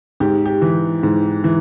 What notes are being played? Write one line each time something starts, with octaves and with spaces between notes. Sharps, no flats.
G#2 G4
G4
E3
G#2
E3